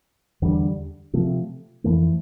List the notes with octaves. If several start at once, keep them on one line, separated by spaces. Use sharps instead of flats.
E2 D3 G3 D4
C3 F3 A3
F2 E3 A3